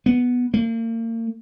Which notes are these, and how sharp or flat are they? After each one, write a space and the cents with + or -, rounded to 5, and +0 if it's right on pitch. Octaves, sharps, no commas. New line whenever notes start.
B3 -5
A#3 -40